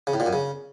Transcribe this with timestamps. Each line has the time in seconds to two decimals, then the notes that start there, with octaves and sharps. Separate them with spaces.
0.07 C#3
0.14 A2
0.20 A#2
0.26 F#2
0.33 C#3